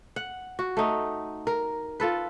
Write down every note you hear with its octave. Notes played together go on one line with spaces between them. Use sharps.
F#5
F#4
A3 D#4
A#4
F4 A4 B4